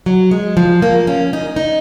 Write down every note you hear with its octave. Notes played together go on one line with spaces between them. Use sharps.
F#3
G#3
F3
A#3
C#4
D#4
D#4